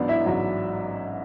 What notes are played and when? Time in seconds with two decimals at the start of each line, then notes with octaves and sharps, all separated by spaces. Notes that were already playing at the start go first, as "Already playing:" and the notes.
Already playing: A1 G#2 F#3 B3 D4 D5
0.08 E4 E5
0.26 A1 G#2 F#3